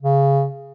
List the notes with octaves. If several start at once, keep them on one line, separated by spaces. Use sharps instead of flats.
C#3